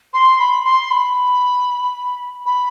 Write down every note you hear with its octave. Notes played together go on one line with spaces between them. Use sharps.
C6
B5
C6
B5
B5